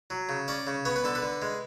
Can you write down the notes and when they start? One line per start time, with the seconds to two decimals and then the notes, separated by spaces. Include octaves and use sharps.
0.10 F#3
0.29 C#3
0.48 C#4 D5
0.67 C#3
0.85 B3 C#5
0.96 B4
1.04 D3 A4
1.15 B4
1.22 D3
1.42 G#3